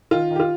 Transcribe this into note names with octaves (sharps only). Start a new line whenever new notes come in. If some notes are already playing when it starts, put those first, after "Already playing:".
D#3 F4
D#3
G4
F4